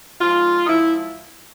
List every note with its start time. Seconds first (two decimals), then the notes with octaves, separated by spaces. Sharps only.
0.21 G#2 F3 F4
0.65 D#4
0.69 G#2 F3 E4